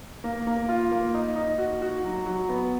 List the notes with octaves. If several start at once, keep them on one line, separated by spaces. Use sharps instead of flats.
A#3
A#3
F4
A#3
D#4
D#4
F#4
F#4
F#3
F#3
B3